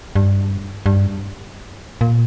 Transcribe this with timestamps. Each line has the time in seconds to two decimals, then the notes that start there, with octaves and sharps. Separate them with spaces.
0.16 G2
0.86 G2
2.01 A#2